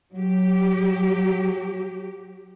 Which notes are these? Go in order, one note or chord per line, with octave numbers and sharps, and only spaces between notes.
F#3 G4